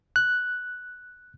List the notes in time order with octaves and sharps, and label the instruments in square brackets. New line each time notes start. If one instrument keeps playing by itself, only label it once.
[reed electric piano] F#6